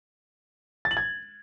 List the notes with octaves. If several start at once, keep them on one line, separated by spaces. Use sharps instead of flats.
A6
F#7
G#6